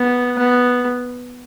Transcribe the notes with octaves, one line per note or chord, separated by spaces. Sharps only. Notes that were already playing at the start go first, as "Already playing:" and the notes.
Already playing: B3
B3